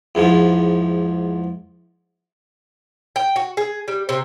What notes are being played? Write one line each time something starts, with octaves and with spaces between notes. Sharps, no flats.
E2 G#2 F3
G5
F#4
G#4
G3
C3